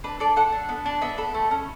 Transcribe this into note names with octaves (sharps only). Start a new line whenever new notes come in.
D4 B4
A4 D5
A4 F#5
D4
B3
D4
B3 E5
A4 B5
A3
C#4